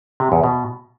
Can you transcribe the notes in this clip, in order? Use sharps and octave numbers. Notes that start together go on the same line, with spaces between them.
C3
E2
B2